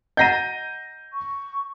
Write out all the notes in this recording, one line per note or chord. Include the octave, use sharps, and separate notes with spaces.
D#5 F#5 A#5 G6 A#6 D#7
C#6